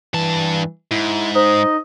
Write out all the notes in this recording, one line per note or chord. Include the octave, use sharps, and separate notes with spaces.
G2 E3 A5
G#2 E4
D#4 C5 D#5